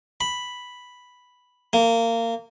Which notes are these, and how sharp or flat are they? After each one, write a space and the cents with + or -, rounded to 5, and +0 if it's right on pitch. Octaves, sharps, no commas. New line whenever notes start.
B5 +0
A#3 -25